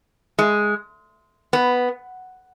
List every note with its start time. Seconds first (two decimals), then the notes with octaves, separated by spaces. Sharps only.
0.39 G#3
1.53 B3